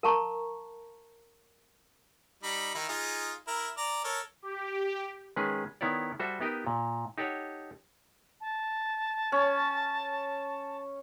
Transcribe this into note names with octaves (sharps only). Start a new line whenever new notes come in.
A#4 F5 A5 A#5 C#6
G3 D#4 B5
D#3 D#4 E4
D#4 F4 G#4
E4 A#4
D5 A#5
A4 A#4 C#5
G4
D#3 G#3 C#4 G#4 B4
D#3 B3 E4 C#5 D5
G3 F#4 A4 C5 E5
B3 D#4 G4 A#4 D#5
A#2
D#4 G4 A4 C#5 F#5
A5
C#4